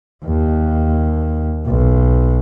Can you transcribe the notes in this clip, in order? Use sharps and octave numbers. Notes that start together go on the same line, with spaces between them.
D#2
B1